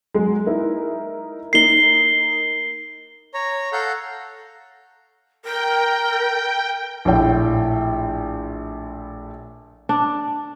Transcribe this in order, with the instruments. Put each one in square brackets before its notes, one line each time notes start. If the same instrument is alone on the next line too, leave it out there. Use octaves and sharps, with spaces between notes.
[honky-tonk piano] F#3 G#3
D#4 E4 A#4
[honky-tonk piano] A#3 D#4 [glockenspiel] C7 G7
[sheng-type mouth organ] C#5 A#5
A4 F5 F#5 A#5 G6
[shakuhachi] A#4 [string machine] G5
[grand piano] A#1 A2 G5
[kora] D4